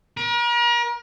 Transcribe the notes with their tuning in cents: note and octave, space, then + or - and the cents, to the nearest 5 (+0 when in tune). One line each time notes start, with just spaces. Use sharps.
A#4 +40